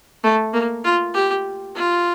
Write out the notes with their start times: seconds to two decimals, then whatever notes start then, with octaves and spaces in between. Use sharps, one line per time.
0.24 A3
0.53 A#3
0.84 F4
1.14 G4
1.75 F4